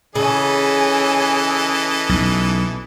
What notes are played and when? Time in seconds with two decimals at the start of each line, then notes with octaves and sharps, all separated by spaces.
0.15 C#3 E3 A4 C#5 D#5 G#5
2.09 B1